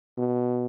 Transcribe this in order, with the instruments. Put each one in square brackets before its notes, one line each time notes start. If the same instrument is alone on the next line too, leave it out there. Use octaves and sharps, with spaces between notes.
[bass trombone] B2